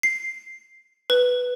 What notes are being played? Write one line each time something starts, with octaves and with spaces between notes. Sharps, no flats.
C7
B4